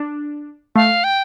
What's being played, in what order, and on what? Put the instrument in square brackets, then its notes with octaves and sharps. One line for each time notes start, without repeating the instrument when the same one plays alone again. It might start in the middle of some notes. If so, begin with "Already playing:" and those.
Already playing: [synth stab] D4
[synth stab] A3 [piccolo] F5
[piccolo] G5